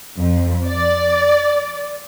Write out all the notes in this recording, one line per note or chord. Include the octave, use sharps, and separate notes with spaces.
F2
D5